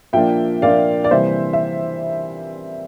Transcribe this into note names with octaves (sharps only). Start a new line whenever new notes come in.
A#2 F3 A#3 D4 E5 G5
A#2 F3 A#3 D4 D5 F5
D5
C3 E3 G3 A#3 C5 E5
E5